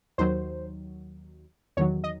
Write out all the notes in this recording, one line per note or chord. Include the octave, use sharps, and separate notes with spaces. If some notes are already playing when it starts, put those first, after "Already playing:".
D#2 D#3 F#3 C5
E2 D#3 F#3 C#5
D#5